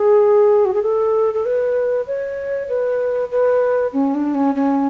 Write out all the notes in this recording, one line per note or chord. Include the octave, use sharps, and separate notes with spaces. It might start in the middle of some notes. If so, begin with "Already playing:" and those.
Already playing: G#4
F#4
G#4
A4
A4
B4
C#5
B4
B4
C#4
D4
C#4
C#4